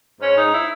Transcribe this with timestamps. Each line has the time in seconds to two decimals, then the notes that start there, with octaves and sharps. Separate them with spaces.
0.20 G#2 C#4
0.36 G#2 D#4
0.52 E4